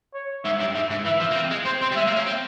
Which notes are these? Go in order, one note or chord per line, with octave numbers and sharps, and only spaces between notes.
C#5
G#2 E5
G2
G#2 E5
G#2
E3 E5
F3
A#3
C4
G#3
C4 C5
C4
G3
G#3 E5
A#3
C#4
C4